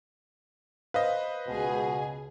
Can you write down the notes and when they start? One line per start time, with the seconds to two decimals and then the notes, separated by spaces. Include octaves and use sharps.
0.94 B4 C5 D#5 F5
1.48 C#2 B2 G#4